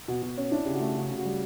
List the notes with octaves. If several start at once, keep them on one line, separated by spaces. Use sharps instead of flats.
B2 F#4
B2
C#4
D4 E4
C#3 G4
F#4
A3
C#3 F#4
C#3
F#4
G3